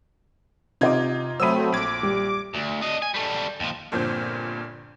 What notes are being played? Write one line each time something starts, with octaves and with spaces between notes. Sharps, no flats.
C3 D#4 F4 D#5 D6 G#6
F#3 A3 C4 C5 B5 D#6 E6 D#7
A#1 D6 G#6
G3
D2
D4 D#5
G#5
G3 A3
D#2 F3
G1 G2 A#2 F3 C4 G6